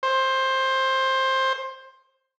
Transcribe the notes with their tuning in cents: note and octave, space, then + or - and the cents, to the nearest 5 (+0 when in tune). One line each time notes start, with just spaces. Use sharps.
C5 +15